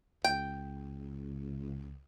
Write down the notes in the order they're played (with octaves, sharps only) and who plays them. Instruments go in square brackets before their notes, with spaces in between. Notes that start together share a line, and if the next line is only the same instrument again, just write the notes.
[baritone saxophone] C#2 [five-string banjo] G5